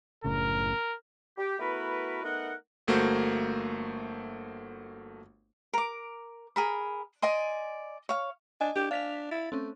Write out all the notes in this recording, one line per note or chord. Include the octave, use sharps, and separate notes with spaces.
F#1 A2 C#3 A#4
G4
A3 B3 E4 F#4 A#4 B4
A3 B3 D#4 A#4 D#5 F#5
G1 A3 A#3 F#4 C5 G6
A#4 D6
G#4 A#4 B5
D5 D#5 G#5 C6
C#5 F5
D4 D#5 G#5
D4 G4
D4 F5 B6 F7
E4 A6
A3 C4 C#4